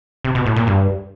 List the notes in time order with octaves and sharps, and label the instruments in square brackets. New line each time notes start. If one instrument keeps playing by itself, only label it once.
[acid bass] C3
B2
A2
A#2
G2